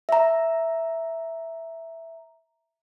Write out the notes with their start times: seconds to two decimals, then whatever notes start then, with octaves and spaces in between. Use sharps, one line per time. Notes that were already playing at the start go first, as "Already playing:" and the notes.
0.09 E5 A#5